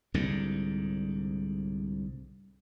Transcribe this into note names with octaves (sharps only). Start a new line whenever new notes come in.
C2 G#2 D3